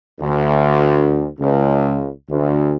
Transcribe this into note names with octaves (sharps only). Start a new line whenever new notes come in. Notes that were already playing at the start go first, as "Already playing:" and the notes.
D2
C#2
D2